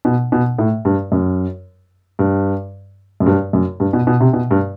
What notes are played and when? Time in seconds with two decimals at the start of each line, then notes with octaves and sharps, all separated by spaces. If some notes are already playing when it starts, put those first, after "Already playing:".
0.05 B2
0.32 B2
0.59 A2
0.85 G2
1.12 F#2
2.19 G2
3.20 F#2
3.26 G2
3.53 F#2
3.80 G2
3.93 B2
4.07 B2
4.21 C3
4.34 B2
4.51 G2